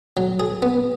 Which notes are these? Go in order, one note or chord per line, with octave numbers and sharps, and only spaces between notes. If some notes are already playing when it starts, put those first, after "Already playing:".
F#3
G#4
B3